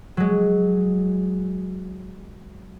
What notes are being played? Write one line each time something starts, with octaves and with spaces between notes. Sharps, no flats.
F#3 G#3